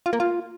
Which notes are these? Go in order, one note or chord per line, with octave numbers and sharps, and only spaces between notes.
F4
A#3
F4